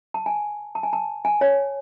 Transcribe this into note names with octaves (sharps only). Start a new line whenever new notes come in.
A5
G#5
A5
G#5
A5
G#5
C#5